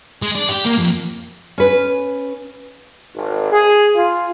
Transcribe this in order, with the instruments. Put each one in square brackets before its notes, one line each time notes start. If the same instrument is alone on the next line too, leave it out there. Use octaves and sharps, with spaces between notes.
[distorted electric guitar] G#3
D4
G4
A#3
F2
[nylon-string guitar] C#4 B4
[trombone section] G#1
G#4
F4